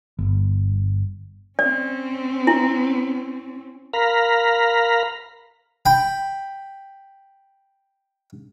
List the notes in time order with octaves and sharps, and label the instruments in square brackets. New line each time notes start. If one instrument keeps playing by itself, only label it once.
[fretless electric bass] G1
[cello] C4 C#4 [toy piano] D5
[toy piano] E4
[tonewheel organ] A#4 F5 A#5 B5
[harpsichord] G5 B5